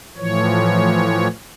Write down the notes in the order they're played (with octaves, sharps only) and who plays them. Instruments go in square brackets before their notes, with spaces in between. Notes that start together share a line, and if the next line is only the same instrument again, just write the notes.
[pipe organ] A2 E3 F3 C#5